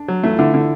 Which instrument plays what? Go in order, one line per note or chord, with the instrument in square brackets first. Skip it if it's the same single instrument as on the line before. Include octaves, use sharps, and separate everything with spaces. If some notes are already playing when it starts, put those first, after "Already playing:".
Already playing: [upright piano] D4
[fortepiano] F#3
[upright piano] E3 E4 [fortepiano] A3
[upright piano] F4
[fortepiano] D3 [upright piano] E3 E4
[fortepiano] D3